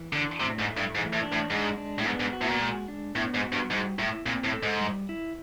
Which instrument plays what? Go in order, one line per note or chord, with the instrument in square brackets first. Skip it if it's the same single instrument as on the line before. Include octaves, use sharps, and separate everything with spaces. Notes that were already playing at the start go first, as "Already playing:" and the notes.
Already playing: [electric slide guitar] E3
[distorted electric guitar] D3 [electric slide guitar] D4
[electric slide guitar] A2 [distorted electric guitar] C3
[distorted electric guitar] G#2
[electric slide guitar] A3
[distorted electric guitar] G2
[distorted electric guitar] G#2 [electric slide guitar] E3
[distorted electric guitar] A2
[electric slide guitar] D4
[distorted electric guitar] A2
[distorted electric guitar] G#2 [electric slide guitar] G#3
[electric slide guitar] D4
[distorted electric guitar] A2
[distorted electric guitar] G#2 [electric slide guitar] B3
[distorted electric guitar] G#2
[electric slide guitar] F#4
[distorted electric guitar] A2
A#2
[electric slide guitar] G#3
D4
[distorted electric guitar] A2 [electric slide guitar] B3
[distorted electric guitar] G#2
[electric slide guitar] F#4
[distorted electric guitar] G2
[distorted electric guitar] G#2 [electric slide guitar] G3
[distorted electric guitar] A2 [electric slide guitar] E4
[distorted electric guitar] A#2 [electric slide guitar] C4
[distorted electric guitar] A2
[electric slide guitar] A4
[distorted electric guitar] G#2
[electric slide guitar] G3
E4